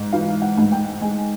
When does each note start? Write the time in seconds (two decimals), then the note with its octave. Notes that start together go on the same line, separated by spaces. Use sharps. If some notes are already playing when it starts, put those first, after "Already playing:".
Already playing: G#2
0.13 E3 F5
0.42 F#5
0.58 G#2
0.72 G5
1.01 G#3 G#5